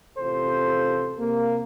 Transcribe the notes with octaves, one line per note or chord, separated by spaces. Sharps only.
A1 C3 F4 A4 C5
C3 A#3